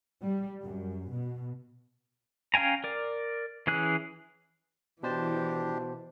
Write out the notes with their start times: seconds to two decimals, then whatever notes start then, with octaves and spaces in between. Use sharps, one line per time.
0.23 G3
0.63 F#2
1.11 B2
2.54 C#4 F5 G5 G#5 A#5
2.84 A#4 D5
3.67 E3 C#4 G#4 F#6
5.03 B2 E3 D4 G4 C5 A5